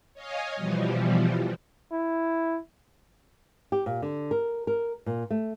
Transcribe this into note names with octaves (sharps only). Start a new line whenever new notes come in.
C#5 D#5 F5 G#5
B2 E3 F3 G3
E4
G4
A#2
D3
A#4
A#4
A#2
A3